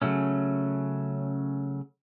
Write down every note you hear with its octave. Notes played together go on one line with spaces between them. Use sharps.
C#3 F#3 A3 C#4